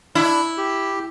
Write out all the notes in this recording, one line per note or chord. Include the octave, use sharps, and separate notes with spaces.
D4 E4
G4